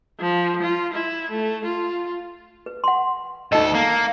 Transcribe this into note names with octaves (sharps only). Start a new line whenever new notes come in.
F3
F4
E4
A3
F4
B4
F#5 C6
D2 D#4 A4 D#5
A#3